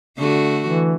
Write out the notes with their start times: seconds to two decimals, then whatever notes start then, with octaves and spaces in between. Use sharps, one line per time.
0.18 D3 A3 F#4
0.65 E3